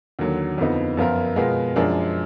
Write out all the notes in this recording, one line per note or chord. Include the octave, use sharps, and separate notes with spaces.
D#2 D3 F#3
F2 D3 F3 B3 D#4
F#2 F3 B3 F4 A#4
B2 G#3 B3 F4 A#4
F#2 F3 G#3 D4